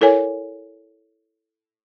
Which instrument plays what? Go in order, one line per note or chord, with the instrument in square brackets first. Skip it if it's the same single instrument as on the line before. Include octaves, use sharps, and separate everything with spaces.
[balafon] E4 A4 A#4 C#5 G#5